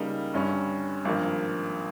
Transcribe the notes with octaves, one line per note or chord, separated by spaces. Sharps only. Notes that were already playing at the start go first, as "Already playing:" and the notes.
Already playing: C#2 C#3 G3 A#3 D#4
G1 G2 G3 C#4
G#1 G2 F3 A#3